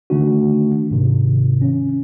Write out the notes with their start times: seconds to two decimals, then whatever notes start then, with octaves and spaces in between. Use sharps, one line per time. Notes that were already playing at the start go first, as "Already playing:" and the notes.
0.10 D3 D#3 A3 D4 F#4
0.91 G#2 C3 D#3
1.62 C#4